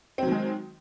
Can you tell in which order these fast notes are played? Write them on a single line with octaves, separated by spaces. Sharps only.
C4 F#3 D#3 G#3